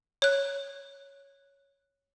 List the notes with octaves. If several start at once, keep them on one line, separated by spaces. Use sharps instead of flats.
C#5 F#6